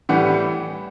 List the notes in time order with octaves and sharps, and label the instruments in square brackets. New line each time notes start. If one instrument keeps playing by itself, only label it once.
[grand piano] A2 E3 G3 B3 F#5